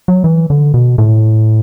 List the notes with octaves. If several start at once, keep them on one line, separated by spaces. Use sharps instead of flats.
F#3
E3
D3
B2
A2